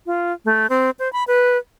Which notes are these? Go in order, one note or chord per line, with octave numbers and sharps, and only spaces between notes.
F4
A3
C4
C5
B5
B4